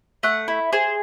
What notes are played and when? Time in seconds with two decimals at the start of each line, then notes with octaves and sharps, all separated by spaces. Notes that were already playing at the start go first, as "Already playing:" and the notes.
0.23 A3 F#5
0.48 E4
0.73 G#4 C5